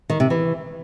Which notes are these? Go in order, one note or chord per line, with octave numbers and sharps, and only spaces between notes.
D#3
C3
E3